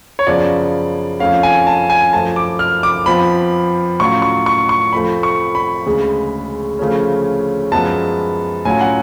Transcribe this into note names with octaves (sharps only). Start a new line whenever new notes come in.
C#5
F#2 C#3 F3 B3 D5
F2 F3 A3 C#4 F5
G#5
A5
G#5
F#2 F3 A3 A5
D6
F6
D6
F2 F3 B3 B5
A2 F#3 C#4 F4 C#6
C#6
C#6
C#6
F2 F3 A3 B5
C#6
B5
D2 C#3 G#3
D2 C#3 F3 A3 C#4
F#2 F3 G#3 B3 A5
A2 F#3 C#4 F4 G#5
F#5